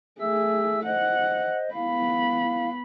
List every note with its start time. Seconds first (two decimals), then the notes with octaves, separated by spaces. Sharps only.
0.21 A3 G#4 E5 E6
0.86 C5 D#5 F#5
1.74 B3 E4 F5 B5